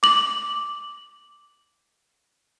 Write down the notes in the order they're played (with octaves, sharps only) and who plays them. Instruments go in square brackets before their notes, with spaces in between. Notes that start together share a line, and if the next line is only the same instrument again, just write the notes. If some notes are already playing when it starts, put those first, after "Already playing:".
[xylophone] D6 F#7